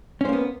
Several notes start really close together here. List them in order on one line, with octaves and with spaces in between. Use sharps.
C#4 C5 A#3 B3